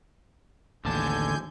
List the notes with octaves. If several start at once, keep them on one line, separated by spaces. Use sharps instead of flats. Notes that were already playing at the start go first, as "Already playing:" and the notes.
A1 D#2 D3 G#5 A5 G6